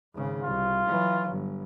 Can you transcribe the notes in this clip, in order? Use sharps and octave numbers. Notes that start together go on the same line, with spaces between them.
G#1 C#3
C2 F4
E3 F#3
G1